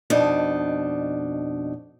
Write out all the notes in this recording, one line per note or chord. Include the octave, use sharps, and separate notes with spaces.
F2 B2 D4 D#4